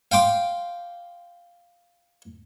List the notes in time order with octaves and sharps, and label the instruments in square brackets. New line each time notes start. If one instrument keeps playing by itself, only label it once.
[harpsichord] F5 G5 C6 D6